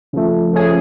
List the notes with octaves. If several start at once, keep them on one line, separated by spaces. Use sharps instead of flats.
C#3 F3 A3
F3 A3 C#4 G#4